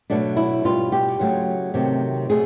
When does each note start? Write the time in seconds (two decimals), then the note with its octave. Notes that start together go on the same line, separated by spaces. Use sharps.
0.10 B2 F#3 A3 D4
0.37 E4
0.64 B2 G3 F4
0.92 G4
1.20 C#3 F#3 A3
1.74 C3 D#3 F#3 A3
2.29 B2 F#3 A3 G#4